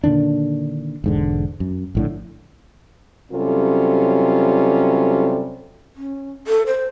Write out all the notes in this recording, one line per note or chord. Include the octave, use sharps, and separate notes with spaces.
A#2 D3 D#3 D4
E1 G#2 D3
F#2
A#1 A2 D3
C3 F#3 G3 C#4 F4 A4
C#4
A4
C5